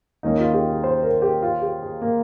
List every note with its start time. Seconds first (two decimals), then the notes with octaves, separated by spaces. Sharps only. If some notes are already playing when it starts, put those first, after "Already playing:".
0.23 D#2 D#3 A#3 C#4 D#4
0.39 F4
0.54 G4
0.68 G#4
0.84 C5
1.03 A#4
1.22 G4
1.42 F4
1.62 G4
1.82 G#4
2.02 A#3